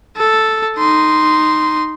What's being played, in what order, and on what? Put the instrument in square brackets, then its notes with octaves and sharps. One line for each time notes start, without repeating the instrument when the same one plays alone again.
[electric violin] A4
D#4 C6